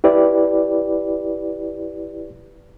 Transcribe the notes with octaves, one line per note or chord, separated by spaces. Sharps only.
E4 G4 B4 D5